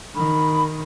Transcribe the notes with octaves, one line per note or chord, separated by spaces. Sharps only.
D#3 B5